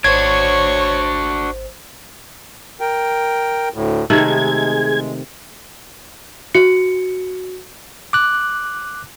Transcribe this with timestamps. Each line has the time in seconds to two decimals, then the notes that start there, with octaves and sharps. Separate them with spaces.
0.04 G#1 D4 F#4 C5 C#5 G#6
2.81 A#4 G5
3.74 D2 A2
4.10 C3 D#3 G#3 A3 G#4 G#6
6.55 F#4 C#7
8.13 D6 F#6